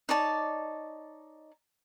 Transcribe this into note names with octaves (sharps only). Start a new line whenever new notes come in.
D#4 C#5 D5 A5